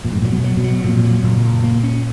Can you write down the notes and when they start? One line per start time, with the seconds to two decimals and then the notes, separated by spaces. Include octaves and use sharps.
0.05 F2 A#2
0.13 G#2
0.22 A#2 F#3
0.31 B2
0.44 F#3
0.57 B2
0.64 F#3
0.84 F2 A#2
1.04 F#3
1.23 F#1 A#2
1.44 F#1
1.64 A#3
1.83 C#4